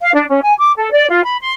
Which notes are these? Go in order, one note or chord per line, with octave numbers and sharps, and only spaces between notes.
F5
D4
C#4
G#5
D6
A4
D5
F4
B5
C6